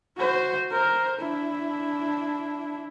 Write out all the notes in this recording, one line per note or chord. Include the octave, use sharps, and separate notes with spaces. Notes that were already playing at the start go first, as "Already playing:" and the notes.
F#4 C5
A#4 C5
D4 E4